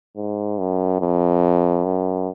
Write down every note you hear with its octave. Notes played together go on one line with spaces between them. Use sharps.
G#2
F#2
F2
F#2